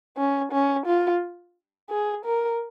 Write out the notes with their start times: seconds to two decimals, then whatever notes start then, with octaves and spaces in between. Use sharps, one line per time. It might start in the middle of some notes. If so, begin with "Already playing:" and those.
0.17 C#4
0.52 C#4
0.86 F4
1.90 G#4
2.25 A#4